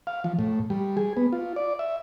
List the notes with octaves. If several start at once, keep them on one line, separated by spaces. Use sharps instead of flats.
F5
F3
A2
G3
G#4
B3
F4
D5
E5